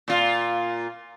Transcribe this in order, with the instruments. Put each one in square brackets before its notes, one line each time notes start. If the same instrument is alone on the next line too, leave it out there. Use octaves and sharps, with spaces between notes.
[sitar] A#2 F4